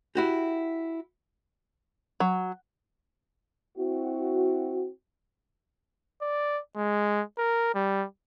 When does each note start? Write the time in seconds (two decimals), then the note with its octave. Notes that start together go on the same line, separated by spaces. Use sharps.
0.15 E4 F#4 G4
2.20 F#3
3.77 C4 E4 F#4
6.22 D5
6.76 G#3
7.38 A#4
7.75 G3